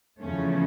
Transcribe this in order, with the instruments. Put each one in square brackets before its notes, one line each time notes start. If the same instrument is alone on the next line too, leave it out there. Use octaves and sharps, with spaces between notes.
[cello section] E2 C#3 F3 A3 C#4